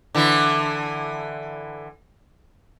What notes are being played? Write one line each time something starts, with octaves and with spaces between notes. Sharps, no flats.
D3 E3 E4